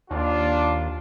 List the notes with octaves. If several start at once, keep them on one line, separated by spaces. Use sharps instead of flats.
D#2 D4 F4